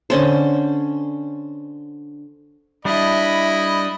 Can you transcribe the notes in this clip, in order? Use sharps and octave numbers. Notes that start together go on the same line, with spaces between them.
D3 C#4 C5
G3 D4 E4 D#5 B5